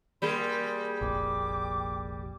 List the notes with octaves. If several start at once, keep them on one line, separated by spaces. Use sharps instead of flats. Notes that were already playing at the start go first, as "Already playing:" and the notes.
G3 A#3 G#4 C6
F1 A#1 G5 D6